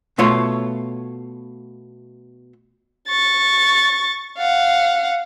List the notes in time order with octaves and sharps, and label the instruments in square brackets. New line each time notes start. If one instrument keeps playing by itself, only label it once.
[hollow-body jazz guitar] B2 A3 F4 C#5 C6
[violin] C#6 A6
F5 F#5